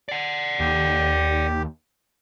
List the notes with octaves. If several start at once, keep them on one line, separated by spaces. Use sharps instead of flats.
D5 F#5
D#2 G4